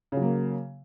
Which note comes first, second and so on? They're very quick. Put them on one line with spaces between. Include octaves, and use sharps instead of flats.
C#3 F#3 A#3